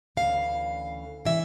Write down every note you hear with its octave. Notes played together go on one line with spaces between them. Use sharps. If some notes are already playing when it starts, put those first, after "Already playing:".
D2 C#3 E3 F5
C#3 E3 E5